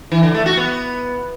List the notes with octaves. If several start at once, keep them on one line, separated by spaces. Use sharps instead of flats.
E3
D3
A3
F#4
B3